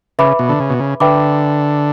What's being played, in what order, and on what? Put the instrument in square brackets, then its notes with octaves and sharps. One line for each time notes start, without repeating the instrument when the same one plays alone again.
[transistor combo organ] C#3 [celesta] B4 E5 B5 D6
[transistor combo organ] B2
D3
C#3
B2
C#3
[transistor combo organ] D3 [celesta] B4 E5 G5 B5 D6